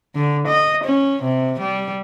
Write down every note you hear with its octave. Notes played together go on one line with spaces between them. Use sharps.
D3
D#5
C#4
C3
G3